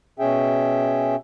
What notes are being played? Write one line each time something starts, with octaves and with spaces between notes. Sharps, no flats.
B2 C#4 G#4 E5 G5